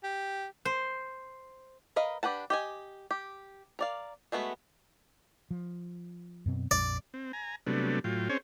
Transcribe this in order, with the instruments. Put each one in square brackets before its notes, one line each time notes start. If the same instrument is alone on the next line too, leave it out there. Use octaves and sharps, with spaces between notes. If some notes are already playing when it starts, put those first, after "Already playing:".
[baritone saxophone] G4
[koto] C5
[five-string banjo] A#4 B4 D#5 F5
D4 G4 B4 F#5 A5
G4 D#5 G#5
G4
A#4 D5 F5
G#3 A3 B3 E4 F#4
[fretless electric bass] F3
F#2 B2 C4
[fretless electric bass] A#1 F2 [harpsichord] D5
[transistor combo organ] C4
G#5 A#5
C3 F#3 G3 A3 B3 D4
A2 F#3 F4 G5
C4 C#4 G#4 C5 C#5